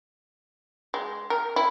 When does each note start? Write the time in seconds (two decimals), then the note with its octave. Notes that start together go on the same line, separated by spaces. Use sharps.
0.94 G#3
1.30 A#4
1.56 E4